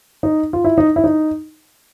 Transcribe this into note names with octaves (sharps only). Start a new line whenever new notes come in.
D#4
F4
E4
D#4
E4
D#4